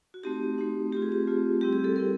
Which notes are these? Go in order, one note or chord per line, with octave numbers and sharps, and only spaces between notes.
F#4
A3 C4 D#4 G4
A3 C4 D#4
A3 C4 F4 G4
G#4
G4
A3 C4 F4
G3 C4 E4 G4
G#4
A4
G3 C4 E4 A#4